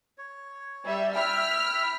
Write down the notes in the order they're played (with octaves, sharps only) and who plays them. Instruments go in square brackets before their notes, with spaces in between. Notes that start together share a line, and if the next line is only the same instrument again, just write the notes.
[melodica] C#5
[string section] G3 E5
[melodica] E4 E5 G5 [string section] F6 B6